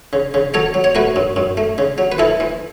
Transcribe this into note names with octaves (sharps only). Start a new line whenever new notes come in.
C#3
C#3
F#3 A4 C#5
F#3
C#5
A3 F#4 B4
F#2
F#2
A3
C#3
F#3
B4
E3 E4 A4
E3